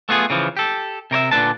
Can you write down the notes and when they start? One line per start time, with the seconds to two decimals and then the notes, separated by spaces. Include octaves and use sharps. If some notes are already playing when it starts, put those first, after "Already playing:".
0.09 A3 B3 F4 G#4
0.30 C#3 E3 F3
0.57 G4 A4
1.11 C3 A#4 C#5 E5
1.31 A#2 D3 G#3 D4 B4 A5